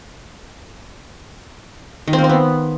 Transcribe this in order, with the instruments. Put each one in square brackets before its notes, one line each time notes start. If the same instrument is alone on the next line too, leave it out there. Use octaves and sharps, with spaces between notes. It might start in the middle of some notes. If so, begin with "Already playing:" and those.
[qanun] D#3
C4
A#3
C4
B3